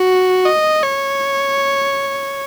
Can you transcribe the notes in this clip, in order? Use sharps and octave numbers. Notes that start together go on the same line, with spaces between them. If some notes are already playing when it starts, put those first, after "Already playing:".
Already playing: F#4
D#5
C#5